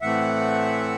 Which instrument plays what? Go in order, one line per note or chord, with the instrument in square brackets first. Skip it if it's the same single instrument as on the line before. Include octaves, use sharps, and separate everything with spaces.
[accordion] A2 E3 A3 C4 E5 F#5